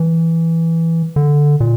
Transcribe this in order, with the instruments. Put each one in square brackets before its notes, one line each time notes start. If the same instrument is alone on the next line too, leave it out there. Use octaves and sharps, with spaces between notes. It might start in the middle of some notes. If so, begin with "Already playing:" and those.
Already playing: [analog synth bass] E3
D3
A#2